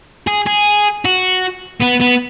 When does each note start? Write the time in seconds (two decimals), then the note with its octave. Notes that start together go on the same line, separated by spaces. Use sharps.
0.27 G#4
0.46 G#4
1.05 F#4
1.82 B3
2.01 B3